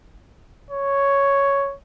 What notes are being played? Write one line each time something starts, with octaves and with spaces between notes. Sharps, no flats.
C#5